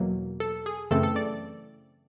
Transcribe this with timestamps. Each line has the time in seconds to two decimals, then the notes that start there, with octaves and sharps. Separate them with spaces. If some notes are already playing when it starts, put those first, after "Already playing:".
Already playing: E2 B2 F#3 A#3
0.40 A4
0.66 G#4
0.91 F#2 C#3 E3 A3 C4 A4
1.03 A4
1.16 D5